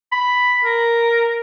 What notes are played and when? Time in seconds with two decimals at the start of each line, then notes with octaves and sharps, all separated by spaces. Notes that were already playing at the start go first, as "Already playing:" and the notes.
0.12 B5
0.64 A#4